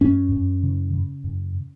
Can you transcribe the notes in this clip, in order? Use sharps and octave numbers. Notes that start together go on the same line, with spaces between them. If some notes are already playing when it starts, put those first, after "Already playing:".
F#2 C#4
F#2
C#3
C#3
F#2